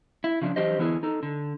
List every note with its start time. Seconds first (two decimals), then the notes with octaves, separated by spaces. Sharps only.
0.24 E4
0.42 C#3 F3 F#3 D4
0.56 E3 F#3 D4 G4 C5 D#5
0.78 D3 E3 B3 E4 F#4 G#4
1.03 D#4 A4
1.23 D3